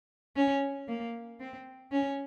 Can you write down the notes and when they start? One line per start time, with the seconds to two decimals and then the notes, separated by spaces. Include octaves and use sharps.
0.36 C#4
0.88 A#3
1.40 C4
1.92 C#4